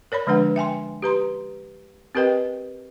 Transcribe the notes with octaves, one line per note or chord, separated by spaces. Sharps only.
A#4 C#5 D5 B5
D3 F3 G#3 D4 B4 F#5
E5 G5 G#5 C6
G4 B4 A#5 C6
C4 G4 A#4 B4 D#5 G5